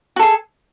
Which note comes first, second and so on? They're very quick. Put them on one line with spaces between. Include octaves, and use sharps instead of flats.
F#4 A4 G#4